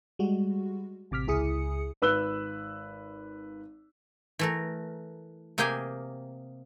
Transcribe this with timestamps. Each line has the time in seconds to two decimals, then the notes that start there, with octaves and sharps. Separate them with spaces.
0.19 G3 G#3 F#4
1.11 A1 C3 D6 F6 B6
1.27 C#2 E4 G#4 D#6 C#7
2.02 G#1 B4 E6 F#6 G7
4.39 E3 A3 A#4
5.58 C3 A#3 G4 G#4 G5 G#5